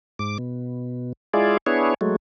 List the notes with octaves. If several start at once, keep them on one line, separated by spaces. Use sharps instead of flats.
G#2 D6
B2
G#3 E4 F4 G#4 D5
B3 D4 E4 G#4 C#5
F#3 G#3 A3